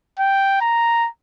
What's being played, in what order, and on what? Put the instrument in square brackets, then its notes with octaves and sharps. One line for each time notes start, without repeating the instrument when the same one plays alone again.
[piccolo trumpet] G5
A#5